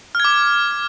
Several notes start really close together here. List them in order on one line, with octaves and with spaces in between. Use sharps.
F6 G#6 D6